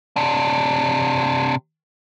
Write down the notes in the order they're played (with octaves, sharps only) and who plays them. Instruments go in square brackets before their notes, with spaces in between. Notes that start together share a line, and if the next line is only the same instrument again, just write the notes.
[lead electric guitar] C3 D4